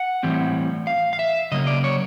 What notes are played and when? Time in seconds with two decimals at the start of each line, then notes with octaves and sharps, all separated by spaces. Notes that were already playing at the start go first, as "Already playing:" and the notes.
Already playing: F#5
0.23 A2 E3 G3 C4
0.87 F5
1.13 F5
1.19 E5
1.52 C#3 F#3 A#3 D#5
1.67 D5
1.84 C#5